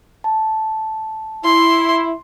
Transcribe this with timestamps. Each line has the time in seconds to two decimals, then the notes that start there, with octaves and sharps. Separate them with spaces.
0.24 A5
1.44 E4 C6